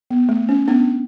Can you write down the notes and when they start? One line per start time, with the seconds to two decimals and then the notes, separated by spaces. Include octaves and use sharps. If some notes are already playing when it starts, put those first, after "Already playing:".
0.11 B3
0.29 A3
0.49 C#4
0.68 B3 D4